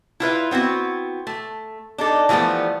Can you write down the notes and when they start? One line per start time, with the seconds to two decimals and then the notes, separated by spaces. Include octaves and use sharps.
0.20 E4 F4 B4 E5
0.51 B3 C4 E4 F#4
1.27 A3
1.98 D4 D#4 A4
2.29 E3 F3 G3 A3 B3